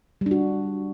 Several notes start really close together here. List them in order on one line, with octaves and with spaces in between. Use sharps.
G3 D4 F#4